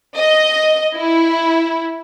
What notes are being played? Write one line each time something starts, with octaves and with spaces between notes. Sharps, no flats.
D#5
E4